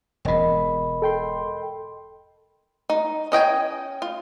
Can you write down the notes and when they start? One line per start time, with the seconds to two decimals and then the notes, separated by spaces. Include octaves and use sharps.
0.25 E1 G#2 A#4 D#5 B5
1.02 A4 G5 C6
2.90 D#4
3.32 C#4 D#5 G5 G#5
4.02 F4